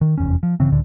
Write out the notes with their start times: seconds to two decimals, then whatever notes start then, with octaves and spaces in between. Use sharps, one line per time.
0.01 D#3
0.18 F1 E2 C#4
0.43 F3
0.60 G1 C#3 E3 C4
0.71 C#2 A2 D3